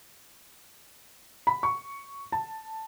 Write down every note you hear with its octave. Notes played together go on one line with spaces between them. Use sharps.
B5
C#6
A5